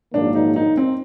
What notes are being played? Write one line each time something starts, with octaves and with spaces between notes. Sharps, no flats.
A#1 G#2 D#3 F#3 A#3 D4
D#4
D#4
C4